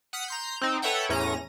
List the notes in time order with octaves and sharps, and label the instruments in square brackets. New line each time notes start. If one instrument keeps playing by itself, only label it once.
[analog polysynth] F#5 D#6 F6 B6 C#7
A#5 C6 G6
C4 D#4
A4 B4 C#5 E5 F#5 G5
E2 A2 C#4 A#5 A#6 D#7